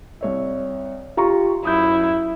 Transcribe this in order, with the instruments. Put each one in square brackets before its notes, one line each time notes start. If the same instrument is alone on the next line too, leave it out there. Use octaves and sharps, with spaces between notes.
[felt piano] C2 C#5 E5
[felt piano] F4 A#5 C#6 [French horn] G4
[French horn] F#2 [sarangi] E4 [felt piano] D#6 G6